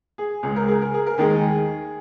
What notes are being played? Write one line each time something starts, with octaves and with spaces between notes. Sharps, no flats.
G#4
C#2 C#3 G#3 G#4
A#4
G#4
A#4
G#4
A#4
D#2 D#3 G#3 G#4